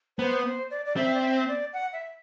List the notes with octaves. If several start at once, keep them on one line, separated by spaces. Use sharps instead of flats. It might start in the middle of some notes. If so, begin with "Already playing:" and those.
B3 C5
C5
D5
D5
C4 E5
D5
E5
D5
F#5
E5